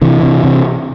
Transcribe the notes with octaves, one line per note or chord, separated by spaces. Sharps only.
C3 E3
C3
C3